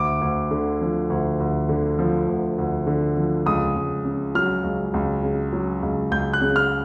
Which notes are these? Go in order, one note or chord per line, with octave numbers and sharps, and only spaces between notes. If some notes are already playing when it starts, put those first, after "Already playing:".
Already playing: D2 D6
D2
D3
F3
D2
D2
D3
F3
D2
D2
D3
F3
C#2 D#6
C#2
C#3
F#3 F6
C#2
C#2
C#3
F#3
C#2
C#2 G6
F#6
C#3
F6